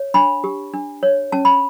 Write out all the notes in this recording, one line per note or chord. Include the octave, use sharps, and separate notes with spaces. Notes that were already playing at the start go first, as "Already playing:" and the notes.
Already playing: C#5
D4 B5
G4
D4
C#5
C#4 A5
B5